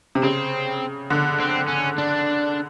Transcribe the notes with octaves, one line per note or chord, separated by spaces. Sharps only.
C3
C#3 C4
D3
C4
C#4
D4